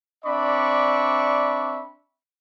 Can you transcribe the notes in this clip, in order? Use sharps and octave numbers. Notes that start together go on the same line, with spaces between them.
C4 D4 D5 E5 B5 C#6